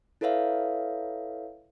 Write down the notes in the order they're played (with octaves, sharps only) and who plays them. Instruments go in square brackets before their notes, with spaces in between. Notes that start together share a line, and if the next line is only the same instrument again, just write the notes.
[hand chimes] E4 A4 B4 C#5 E5 F5